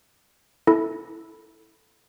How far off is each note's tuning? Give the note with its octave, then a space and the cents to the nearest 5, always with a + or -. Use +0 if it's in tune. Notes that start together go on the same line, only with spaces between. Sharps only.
E4 -10 A4 +0